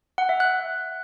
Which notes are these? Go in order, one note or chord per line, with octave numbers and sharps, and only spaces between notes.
F#5
E5
F#6